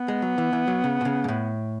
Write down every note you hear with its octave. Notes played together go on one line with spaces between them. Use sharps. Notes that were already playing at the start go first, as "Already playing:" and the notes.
Already playing: B3
G#3
F#3
E3
E3
F#3
C#3
B2
C#3
G#2
A2